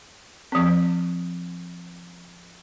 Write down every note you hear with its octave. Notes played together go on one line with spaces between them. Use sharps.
F3 C4